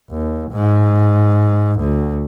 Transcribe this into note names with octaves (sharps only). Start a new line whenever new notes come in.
D#2
G#2
D2